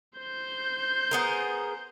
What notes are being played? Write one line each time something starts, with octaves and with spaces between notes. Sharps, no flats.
C5 G6
B3 G#4 A#4